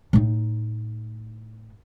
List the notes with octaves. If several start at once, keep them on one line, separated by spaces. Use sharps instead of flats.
A2 D#4